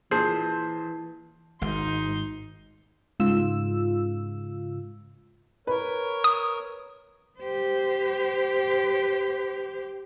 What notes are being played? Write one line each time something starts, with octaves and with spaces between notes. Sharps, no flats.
A#2 E3 G#4 C5 A5
G#1 G#2 D#4 C6
G#2 C#3 F4 E6
A#4 B4 C#5
D#6
G4 C5